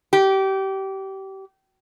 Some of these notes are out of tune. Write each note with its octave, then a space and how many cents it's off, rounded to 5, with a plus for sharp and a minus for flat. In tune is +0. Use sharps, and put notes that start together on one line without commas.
G4 -25